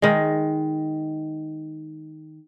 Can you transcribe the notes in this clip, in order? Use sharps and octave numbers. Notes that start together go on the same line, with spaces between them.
D#3 G#3